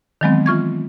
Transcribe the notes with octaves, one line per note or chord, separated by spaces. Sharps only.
D#3 E3 F#3 G#3 B3 C4
E3 F4 C#6 G#6